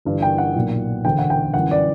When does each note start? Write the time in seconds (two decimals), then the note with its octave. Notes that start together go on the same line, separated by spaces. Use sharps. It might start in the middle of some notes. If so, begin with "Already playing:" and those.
0.05 G1 G2 E3
0.22 G5
0.38 F#5
0.56 B1 A#2
1.04 E1 D2 D3 G5
1.18 F#5
1.30 G5
1.54 G1 F#2 E3 F#5
1.71 D5